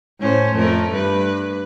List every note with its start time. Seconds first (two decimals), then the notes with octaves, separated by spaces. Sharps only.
0.20 A2 C#4 C5
0.55 F2 A3 A#4
0.92 G2 B4